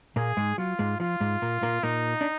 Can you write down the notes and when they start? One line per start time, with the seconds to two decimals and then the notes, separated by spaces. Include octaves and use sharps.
0.16 A#2 A#3 G#4
0.37 G#2 G#3
0.58 F#3 F4
0.79 G#2 G#3
1.00 F3 F4
1.20 G#2 G#3
1.42 A#2 A#3
1.62 A#2 A#3
1.83 A#2 A#3 D#4
2.21 D4